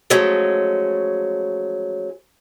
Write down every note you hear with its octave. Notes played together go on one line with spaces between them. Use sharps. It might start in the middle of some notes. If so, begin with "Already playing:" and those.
F3 F#3 G#3 A3 C#4